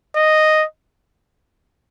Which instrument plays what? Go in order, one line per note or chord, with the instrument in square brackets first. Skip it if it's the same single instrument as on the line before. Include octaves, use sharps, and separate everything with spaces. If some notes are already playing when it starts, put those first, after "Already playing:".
[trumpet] D#5